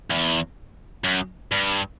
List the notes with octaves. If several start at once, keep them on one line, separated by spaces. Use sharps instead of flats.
E2
F#2
G2